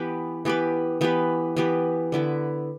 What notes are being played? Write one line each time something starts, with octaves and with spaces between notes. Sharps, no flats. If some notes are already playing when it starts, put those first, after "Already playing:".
Already playing: E3 B3 G4 B4
E3 B3 G4 B4
E3 B3 G4 B4
E3 B3 G4 B4
D3 B3 E4 B4